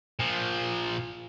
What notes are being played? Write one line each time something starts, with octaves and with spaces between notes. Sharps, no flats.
A#2 F3